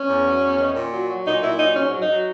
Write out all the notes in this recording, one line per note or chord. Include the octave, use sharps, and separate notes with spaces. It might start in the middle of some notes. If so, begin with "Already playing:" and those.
Already playing: C#4
E2
F#3
E2
D#3
A#2
F#3
F#3
A#2 D#4
A#2 E4
F#3 D#4
G#2 C#4
F#3
D#4
F#3